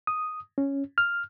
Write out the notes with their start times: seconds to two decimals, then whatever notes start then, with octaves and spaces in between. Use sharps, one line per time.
0.07 D#6
0.58 C#4
0.98 F6